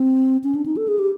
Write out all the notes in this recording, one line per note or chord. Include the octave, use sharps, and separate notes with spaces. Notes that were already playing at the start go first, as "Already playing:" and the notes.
Already playing: C4
C#4
D4
D#4
A4
G#4
G4